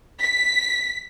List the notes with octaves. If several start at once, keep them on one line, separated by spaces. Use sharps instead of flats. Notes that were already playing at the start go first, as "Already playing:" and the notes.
B6